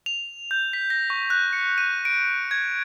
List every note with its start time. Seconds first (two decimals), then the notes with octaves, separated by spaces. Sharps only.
0.06 F7
0.51 G6
0.73 B6
0.90 A#6
1.10 C#6
1.30 F#6
1.53 C#7
1.78 D#7
2.05 D7
2.51 G#6